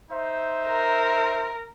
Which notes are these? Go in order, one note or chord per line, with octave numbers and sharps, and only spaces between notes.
D#4 C5 E5
A#4